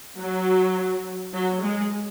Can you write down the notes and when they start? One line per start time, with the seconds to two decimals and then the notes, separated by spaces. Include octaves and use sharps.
0.17 F#3
1.32 F#3
1.62 G#3